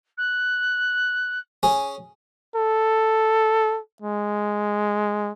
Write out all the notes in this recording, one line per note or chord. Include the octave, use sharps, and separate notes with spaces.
F#6
C#4 G#4
A4
G#3